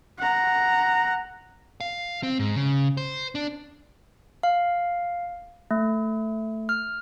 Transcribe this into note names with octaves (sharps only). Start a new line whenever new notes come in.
F#5 A#5
F5
C4
G#2
C#3
C5
D4
F5
A3
F6